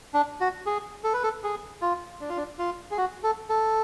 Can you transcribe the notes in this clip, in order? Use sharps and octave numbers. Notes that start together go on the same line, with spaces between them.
D4
F#4
G#4
A4
B4
A4
G#4
F4
D4
F4
D4
F4
G#4
F#4
A4
A4